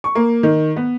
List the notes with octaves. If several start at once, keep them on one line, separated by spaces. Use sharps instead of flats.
C#6
A#3
D#3
B3